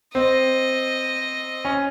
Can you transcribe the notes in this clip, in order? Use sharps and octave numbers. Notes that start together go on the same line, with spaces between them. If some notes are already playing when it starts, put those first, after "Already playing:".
C4 D#5
C#4